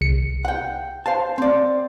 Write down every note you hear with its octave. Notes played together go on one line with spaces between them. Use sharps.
C2 C#7
F#5 G5
C5 F5 A5
C4 D5